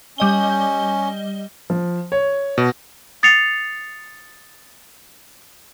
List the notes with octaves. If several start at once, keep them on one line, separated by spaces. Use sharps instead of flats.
G3 C#4 D#5 G7
F3
C#5
B2
D#6 A6 C7 C#7 F7